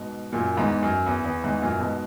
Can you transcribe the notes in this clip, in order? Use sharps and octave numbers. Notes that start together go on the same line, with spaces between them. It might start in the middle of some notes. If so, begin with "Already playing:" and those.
Already playing: G#2 B2
F#2 A#2
E2 G#2
F#2
E2
E2
E2 G#2
F#2 A#2
G#2 B2